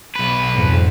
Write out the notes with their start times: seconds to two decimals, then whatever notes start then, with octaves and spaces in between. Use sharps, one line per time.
0.16 B1 B4
0.54 F2 G#2